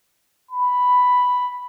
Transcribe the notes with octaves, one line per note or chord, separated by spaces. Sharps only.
B5